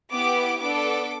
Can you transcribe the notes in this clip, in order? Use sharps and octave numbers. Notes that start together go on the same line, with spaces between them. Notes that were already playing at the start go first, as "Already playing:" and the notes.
B3 E4 G4 D6
B3 D4 A4 D6